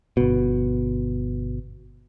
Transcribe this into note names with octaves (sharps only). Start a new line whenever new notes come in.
G1 B2